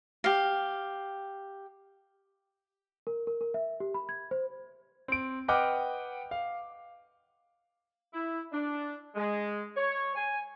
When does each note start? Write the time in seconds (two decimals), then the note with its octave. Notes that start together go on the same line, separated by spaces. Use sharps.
0.24 G4 F5
3.07 A#4
3.27 A#4
3.41 A#4
3.54 E5
3.80 G4
3.94 B5
4.09 G#6
4.31 C5
5.08 C4 D7
5.48 B4 D#5 F#5 G5 D6 F6
6.31 F5
8.13 E4
8.52 D4
9.15 G#3
9.76 C#5
10.16 G#5